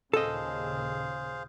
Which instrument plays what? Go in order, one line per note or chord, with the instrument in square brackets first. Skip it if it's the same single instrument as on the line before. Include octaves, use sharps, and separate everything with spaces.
[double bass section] D#2 A#2 C#3 [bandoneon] G#4 C5 F5 [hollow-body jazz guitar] A4 D#5